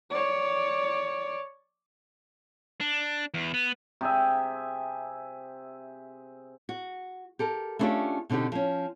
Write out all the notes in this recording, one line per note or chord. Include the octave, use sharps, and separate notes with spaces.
C#5 D5
D4
E2
B3
C3 G#4 E5
F#4
G4 A4 A#4
A3 B3 C#4 D4 F4 G4
B2 D3 C4 D#4 G4
F3 C#4